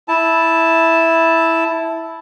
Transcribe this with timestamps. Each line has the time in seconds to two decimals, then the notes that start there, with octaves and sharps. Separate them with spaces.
0.08 E4 A5